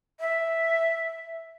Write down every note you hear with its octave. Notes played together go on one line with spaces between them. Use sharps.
E5